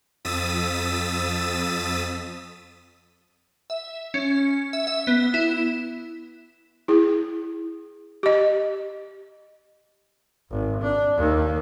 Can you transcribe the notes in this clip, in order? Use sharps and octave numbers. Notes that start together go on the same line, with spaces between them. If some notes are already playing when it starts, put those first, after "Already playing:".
F2 D#6 E6 A6 B6 D#7
E5
C#4
E5
E5
B3
E4
E4 G#4
G4 D#5
G#1
D4
D#2